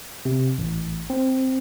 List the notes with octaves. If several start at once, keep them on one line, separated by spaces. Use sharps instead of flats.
C3
A1
C4